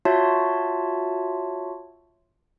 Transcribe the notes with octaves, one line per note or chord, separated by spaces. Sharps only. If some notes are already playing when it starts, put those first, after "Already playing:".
F4 F#4 C#5 E5 A5 C6